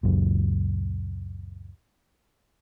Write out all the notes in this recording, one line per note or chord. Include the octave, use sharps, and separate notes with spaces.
C#2 F#2 A#2